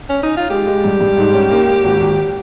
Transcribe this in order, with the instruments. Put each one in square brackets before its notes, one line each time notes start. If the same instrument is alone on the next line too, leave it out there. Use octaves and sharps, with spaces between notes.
[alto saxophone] C#4
D#4
F4
[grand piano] G#3 [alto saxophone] G4
[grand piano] G#3
G2
G2
G#2
C#4
A#3
A#3
G#1
G#1